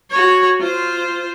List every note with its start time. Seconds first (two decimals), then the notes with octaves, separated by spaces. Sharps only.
0.10 F#4 C#5
0.60 F4 C5